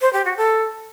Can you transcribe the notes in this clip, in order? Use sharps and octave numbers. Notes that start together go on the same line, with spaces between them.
C5
G4
F#4
A4